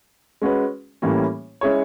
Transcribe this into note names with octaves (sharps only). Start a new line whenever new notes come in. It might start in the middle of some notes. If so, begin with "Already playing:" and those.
G#3 C#4 F#4 B4
A2 E3 G3 A#3 C#4
G#3 C#4 E4 G#4 C#5